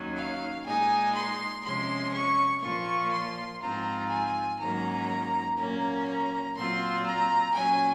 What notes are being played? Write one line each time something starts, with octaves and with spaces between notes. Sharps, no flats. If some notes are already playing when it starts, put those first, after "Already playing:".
Already playing: D#2 D#3 F#3 C#4
F5
A#2 G#3 D#4 G#5
C6
C3 F3 G#3 C#4 C6
C#6
A#2 F3 A#3 F4 C#6
C6
G#2 F3 C4 F4 A#5
G#5
G#2 D#3 F#3 A#3 C#4 A#5
A#2 F#3 A#3 C#4 A#5
A#5
A#2 F#3 C4 F4 C6
A#5
A#2 F#3 C#4 G#5